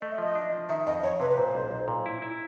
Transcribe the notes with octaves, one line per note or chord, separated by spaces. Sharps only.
A3 D#5
E5
F3 D#5
D4
F3
D#3 E5
F2 D#5
F2 C#5
C3 B4
B4
A#2 C5
B1
B1
A#2
E4
E4